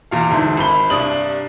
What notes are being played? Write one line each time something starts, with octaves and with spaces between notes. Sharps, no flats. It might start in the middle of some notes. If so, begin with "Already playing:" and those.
E2 A#2 F5
G1 D2 G#2 E3
G#1 B5 G7
C2 G2 D4 D#6 F#7